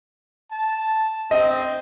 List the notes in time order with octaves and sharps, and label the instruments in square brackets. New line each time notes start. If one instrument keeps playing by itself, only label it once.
[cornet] A5
[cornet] C4 [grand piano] D#5